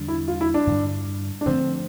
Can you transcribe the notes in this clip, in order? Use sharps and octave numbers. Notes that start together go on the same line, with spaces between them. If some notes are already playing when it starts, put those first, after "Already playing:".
Already playing: E2 D3 G3 D4
E4
F4
E4
D4
G2 D3 G3
D4
D2 D3 F3 A3 C4